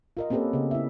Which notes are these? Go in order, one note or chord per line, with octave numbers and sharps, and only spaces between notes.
F4 A#4 D#5
A#3 C4 C#4 G4 A4 B4
C#3 B3 D#5
E4 E5